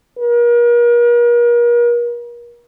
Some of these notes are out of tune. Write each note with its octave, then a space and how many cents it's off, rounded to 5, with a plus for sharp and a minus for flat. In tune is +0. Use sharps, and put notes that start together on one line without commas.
A#4 +40